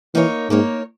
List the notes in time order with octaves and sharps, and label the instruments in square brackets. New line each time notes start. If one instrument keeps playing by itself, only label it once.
[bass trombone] E3 [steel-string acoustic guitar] A#3 D#4 A#4 C#5
[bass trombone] G#2 [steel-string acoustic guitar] A#3 D#4 A#4 C#5